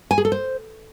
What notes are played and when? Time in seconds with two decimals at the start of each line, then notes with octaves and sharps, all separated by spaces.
0.11 G#5
0.18 G#4
0.25 A4
0.32 C5